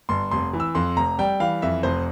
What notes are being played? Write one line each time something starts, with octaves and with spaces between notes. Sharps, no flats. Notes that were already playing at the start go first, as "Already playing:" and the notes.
G1 C6
F1 C6
E3
E6
F2 C6
F1 A#5
G3 G5
E3 F5
F2 E5
F1 C5